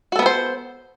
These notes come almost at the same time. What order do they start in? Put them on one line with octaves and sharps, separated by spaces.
F#4 A4 B3 B4 C5